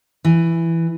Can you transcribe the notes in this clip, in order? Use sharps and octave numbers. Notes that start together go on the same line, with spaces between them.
E3